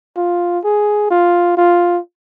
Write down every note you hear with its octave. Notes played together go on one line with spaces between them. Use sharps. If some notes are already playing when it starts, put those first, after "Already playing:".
F4
G#4
F4
F4